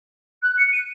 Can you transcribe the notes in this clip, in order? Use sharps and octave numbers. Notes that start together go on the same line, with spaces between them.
F#6
C#7
D#7